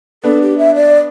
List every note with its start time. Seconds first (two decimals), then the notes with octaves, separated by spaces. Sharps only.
0.24 B3 D4 A4
0.42 G4
0.58 E5
0.75 D5